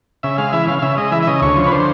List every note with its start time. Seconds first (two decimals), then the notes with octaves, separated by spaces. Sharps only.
0.23 C#3 E5
0.38 G#3 F5
0.52 E3 E5
0.67 C#3 F5
0.79 F5
0.82 C#3 E5
0.97 G#3 D#5
1.12 E3 E5
1.22 E5
1.27 C#3 D#5
1.42 D2 C#5
1.56 F3
1.66 B4
1.71 D3 C5